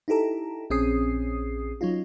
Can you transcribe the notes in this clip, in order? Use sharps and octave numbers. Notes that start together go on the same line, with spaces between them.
D#4 E4 G4 A4 A#5
A#1 C4 C#4 G#4 D#6 C7
F#3 C#4 D#4 F4